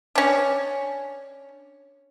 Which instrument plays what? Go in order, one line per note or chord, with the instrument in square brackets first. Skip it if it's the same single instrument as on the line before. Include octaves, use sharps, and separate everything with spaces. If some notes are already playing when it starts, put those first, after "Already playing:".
[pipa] C#4 D4